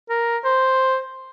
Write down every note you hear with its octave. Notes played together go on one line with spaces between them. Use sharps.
A#4
C5